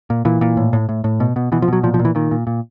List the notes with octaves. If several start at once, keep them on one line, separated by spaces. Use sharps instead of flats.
A#2
A#2 E3
A#2
A2
A2
A2
A2
B2
B2
B2 E3
F3
B2 F#3
A#2 F3
F3
A#2
E3
A#2 D#3
A#2
A#2